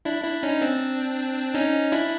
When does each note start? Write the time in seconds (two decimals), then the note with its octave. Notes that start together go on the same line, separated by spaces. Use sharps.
0.05 D4 E4
0.24 D4 E4
0.43 C#4 D#4
0.62 C4 D4
1.54 C#4 D#4
1.92 D4 E4